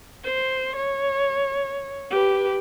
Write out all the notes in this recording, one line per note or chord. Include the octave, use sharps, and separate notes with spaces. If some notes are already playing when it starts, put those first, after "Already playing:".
C5
C#5
G4 B4